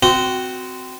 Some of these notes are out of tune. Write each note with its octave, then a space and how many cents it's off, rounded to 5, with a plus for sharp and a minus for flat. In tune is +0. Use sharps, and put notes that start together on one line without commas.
C4 -20 F#4 +0